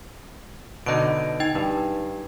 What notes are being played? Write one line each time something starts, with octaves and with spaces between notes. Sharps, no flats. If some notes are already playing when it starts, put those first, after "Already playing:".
B2 D3 D#4 D#5 D7
D#4 G5 G#6
G2 D#4